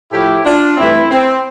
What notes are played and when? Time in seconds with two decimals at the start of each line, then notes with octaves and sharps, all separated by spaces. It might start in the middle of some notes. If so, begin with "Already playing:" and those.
0.12 A2 F3 A3 E4 G4
0.44 D4 F4
0.77 G2 E3 A3 C4 E4
1.10 C4